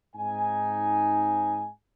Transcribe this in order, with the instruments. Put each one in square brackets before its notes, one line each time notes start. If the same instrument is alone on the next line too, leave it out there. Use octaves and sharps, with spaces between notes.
[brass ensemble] G#2 C4 D#4 G#5